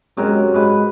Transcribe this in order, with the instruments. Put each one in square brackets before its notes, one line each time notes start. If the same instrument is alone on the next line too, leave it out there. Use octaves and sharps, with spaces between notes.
[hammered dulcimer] F#2 C3 A#4 [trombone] G#3
[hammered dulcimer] G#2 B4 [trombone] G#3